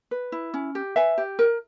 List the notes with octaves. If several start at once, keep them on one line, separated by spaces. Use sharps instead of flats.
B4
E4
C#4
G4
B4 E5 G#5
G4
A#4